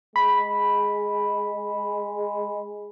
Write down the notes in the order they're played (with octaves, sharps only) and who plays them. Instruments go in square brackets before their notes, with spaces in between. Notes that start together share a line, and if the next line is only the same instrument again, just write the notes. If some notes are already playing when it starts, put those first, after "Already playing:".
[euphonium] G#3 [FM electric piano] B5